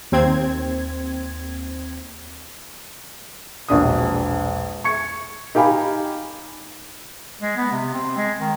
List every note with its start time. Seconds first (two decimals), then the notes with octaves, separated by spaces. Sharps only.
0.12 D#2 C4 G#6
3.68 E1 A#1 D4 D#6
4.84 C#6 G#6 C#7
5.55 D#4 G4 F5 G#5 B5
7.41 G#3
7.57 B3
7.72 C3
7.94 C4
8.17 G#3
8.41 D#3